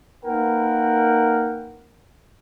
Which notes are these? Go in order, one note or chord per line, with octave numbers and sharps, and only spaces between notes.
A#3 D#4 A#4 B4 F#5 G5